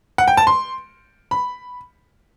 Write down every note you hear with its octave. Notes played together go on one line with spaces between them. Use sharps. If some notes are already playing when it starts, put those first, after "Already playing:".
F#5
G5
A5
C6
B5